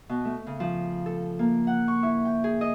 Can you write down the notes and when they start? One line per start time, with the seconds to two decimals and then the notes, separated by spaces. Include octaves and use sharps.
0.09 B2
0.25 A3
0.47 C#3
0.60 F3
1.06 A4
1.39 A#3
1.67 F#5
1.88 C#6
2.03 E4
2.25 G5
2.44 G#4
2.61 D#5